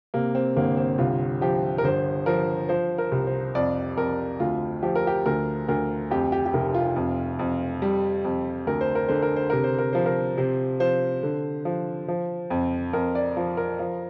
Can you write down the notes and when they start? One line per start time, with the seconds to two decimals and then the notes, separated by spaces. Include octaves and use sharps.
0.14 C3 A#3
0.35 C4
0.56 G1 A#3
0.77 C4
0.98 C2 F4
1.41 F3 G4
1.78 A#4
1.84 G1 C5
2.26 F3 A#4
2.69 F3 C5
2.98 A#4
3.12 C2
3.27 C5
3.55 F2 D5
3.97 F2 A#4
4.40 D2 F4
4.83 F3 G4
4.96 A#4
5.07 G4
5.26 D2 A#4
5.68 D2 A#4
6.11 F2 G4
6.32 G4
6.46 G4
6.53 F1 A#4
6.74 F4
6.96 F2
7.39 F2
7.82 G3
8.25 F2
8.67 D2 A#4
8.81 C5
8.95 A#4
9.08 D3 C5
9.23 A#4
9.36 C5
9.50 C3 A#4
9.64 C5
9.79 A#4
9.93 F3 C5
10.06 A#4
10.37 C3 C5
10.80 F3 C5
11.23 D3
11.65 F3
12.08 F3
12.50 F2
12.93 F2 A#4
13.15 D5
13.37 F3
13.57 A#4
13.79 F3